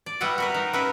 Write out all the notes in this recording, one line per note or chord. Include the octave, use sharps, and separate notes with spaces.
D5
G3 B3 E4 F#4 D#5 F#5
F#4 A#4 B4
D#4
B3 C#4 E4 F#4 A#4 B4